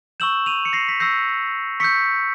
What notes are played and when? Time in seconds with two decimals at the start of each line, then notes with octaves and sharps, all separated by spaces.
0.20 C#6 E6 G6 E7 F#7
0.46 D#7 F7
0.65 C#7
0.73 A#6 C7
0.88 B6
1.00 C#6 E6 G6 A#6 C7
1.80 C#6 E6 G6 B6 C#7